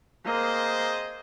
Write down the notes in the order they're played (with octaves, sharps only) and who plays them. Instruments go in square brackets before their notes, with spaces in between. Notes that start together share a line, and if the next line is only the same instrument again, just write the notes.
[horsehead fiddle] A#3 [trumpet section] C4 G#4 C5 D#5